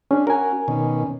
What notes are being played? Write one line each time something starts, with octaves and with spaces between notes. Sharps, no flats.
C#4 D4 G#4
C#4 F#4 A#4 G#5
B2 D#3 C#4